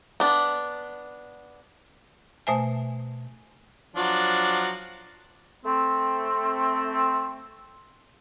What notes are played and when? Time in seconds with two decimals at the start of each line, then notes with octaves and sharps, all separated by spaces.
0.20 B3 D4
2.47 B2 A3 C5 E5 G#5
3.96 F3 F#3 D4
5.65 A3 C4